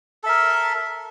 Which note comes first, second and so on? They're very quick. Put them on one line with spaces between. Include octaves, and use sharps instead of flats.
A4 E5 A#4